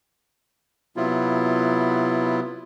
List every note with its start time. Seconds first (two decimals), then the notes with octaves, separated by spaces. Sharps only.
0.97 C3 F#3 B3 E4 F4